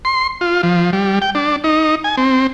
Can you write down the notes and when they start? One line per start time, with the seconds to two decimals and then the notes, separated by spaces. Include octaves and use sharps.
0.05 C6
0.41 F4
0.63 F3
0.93 G3
1.22 G5
1.35 D4
1.64 D#4
2.04 G#5
2.17 C4